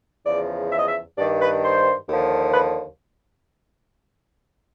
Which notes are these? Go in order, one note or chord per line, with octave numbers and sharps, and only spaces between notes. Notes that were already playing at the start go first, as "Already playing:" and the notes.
E2 C#3 F3 D5
E5
D#5
E5
G2 D#3 D5
B4
C5
D#2 D3 F3
B4